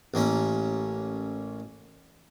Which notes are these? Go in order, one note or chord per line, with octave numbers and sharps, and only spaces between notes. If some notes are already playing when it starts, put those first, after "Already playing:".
A1 A#3 C#4 A#5